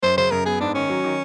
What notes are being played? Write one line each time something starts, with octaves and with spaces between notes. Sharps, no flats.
F#2 C5
C#3 C5
F#2 A#4
B3 G#4
G#2 D4
D#3 C#4
F#3
D#3